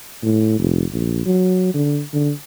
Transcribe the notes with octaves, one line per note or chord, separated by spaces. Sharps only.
A2
F1
A#1
F#3
D3
D3